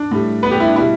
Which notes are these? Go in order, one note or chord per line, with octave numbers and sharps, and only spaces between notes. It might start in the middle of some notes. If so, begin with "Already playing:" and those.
Already playing: D4
A2 G3
B3 B4
G3 G4
E4
D4
B2 G3 E4